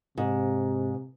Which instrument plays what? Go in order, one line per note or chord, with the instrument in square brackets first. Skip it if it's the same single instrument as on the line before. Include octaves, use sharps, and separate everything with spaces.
[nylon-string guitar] G#2 [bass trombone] C3